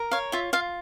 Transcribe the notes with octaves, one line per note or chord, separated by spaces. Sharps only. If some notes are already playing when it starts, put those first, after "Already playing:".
Already playing: A#4
C#5 F5
F4 E5
F4 F5